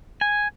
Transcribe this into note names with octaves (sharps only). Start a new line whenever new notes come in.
G#5